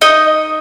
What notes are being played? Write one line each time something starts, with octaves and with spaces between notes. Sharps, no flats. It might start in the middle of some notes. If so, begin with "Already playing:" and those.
D#4 D#5